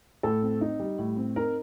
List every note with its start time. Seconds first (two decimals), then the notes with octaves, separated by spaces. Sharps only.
0.23 A2 A4
0.42 C4
0.61 D#4
0.80 G3
0.99 A2
1.17 C4
1.36 D#4 A#4